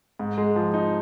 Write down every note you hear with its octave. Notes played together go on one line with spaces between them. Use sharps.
G#2
G#3
F3
D#4